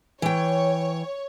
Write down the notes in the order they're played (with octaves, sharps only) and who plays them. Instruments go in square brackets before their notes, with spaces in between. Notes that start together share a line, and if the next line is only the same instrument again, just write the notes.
[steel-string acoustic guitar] E3 G5 [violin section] C#5